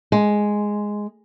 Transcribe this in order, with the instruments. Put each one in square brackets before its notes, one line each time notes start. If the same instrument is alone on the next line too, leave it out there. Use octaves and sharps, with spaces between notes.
[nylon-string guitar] G#3